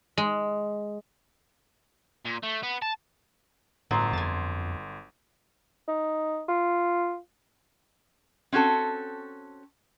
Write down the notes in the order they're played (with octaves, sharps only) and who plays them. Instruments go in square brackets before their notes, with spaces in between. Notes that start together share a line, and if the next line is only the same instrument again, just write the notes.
[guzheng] G#3
[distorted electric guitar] A#2
A3
B3
A5
[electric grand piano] G1 C6 [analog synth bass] A2 [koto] F#3
[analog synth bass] F2 [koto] G#5 A5
[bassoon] D#4
F4
[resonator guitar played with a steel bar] C4 C#4 F#4 A4